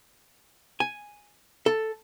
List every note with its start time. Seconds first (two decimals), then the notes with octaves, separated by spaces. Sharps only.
0.80 G#5
1.66 A4